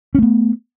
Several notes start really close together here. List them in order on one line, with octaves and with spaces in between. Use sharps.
C#4 A3 B3